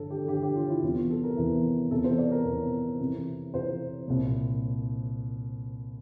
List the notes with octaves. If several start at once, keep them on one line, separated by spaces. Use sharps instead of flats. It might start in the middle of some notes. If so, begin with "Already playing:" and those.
Already playing: G2 D3 A4
G4
A4
G2 D3 G4
G4
F4
E4
E2 C3 E3 F4
A4
A#4
E2 C3 E3
E2 C3 E3 A4
C5
D5
A#4
E2 C3 E3
F2 C3 E3
F2 C3 E3 C5
C2 A#2